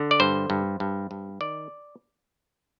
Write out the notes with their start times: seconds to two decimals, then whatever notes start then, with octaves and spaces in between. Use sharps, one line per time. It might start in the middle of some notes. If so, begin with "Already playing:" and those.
Already playing: D3
0.11 D5
0.20 G2 C5
0.50 G2
0.80 G2
1.11 G2
1.41 D#3 D5